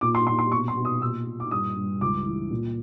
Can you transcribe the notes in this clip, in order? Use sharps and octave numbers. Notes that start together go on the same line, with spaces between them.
A#2 D6
C6
A#2 C6
C6
B2 C#6
C6
B2
D#6
A#2 E6
A#2
D6
G2 D#6
G2
C#2 D6
E3
A#2